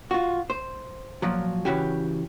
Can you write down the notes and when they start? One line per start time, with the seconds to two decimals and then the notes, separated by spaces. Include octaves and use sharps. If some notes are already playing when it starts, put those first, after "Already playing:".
0.11 F4 F#4
0.50 C5
1.22 A#2 F3 F#3
1.65 C#3 E3 C#4 F#4 G4